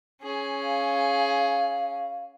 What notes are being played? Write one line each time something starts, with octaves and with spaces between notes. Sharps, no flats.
C#4 G#4
F5